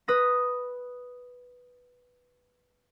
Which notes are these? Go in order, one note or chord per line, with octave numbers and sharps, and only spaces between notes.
B4 D#6 A#6